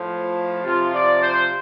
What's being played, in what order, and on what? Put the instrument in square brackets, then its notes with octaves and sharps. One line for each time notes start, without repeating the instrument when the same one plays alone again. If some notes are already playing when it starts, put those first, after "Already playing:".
Already playing: [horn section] A2 F3
C3 F3 F4
D5
C5